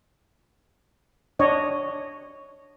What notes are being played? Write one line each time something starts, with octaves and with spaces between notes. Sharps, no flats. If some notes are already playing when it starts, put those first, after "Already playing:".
D4 C#5 D#5